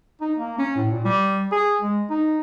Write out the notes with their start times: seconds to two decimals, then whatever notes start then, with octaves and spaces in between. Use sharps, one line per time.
0.21 D#4
0.38 A#3
0.58 C#4
0.76 A2
0.92 A#2
1.05 G3
1.52 G#4
1.81 G#3
2.10 D#4